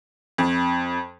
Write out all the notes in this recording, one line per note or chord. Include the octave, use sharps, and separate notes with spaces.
F2